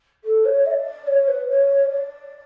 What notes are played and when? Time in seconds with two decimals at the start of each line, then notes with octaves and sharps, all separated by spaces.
0.24 A4
0.44 C#5
0.66 E5
0.70 D5
1.07 C#5
1.27 B4
1.48 C#5
1.89 D5